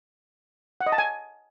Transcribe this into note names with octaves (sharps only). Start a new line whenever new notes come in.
F#5
D#5
A5
G#5